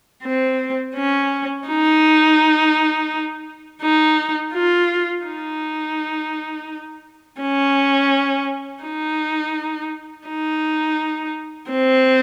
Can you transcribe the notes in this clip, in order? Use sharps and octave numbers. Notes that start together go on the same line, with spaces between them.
C4
C#4
D#4
D#4
F4
D#4
C#4
D#4
D#4
C4